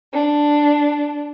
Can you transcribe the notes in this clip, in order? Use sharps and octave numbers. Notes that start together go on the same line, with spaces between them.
D4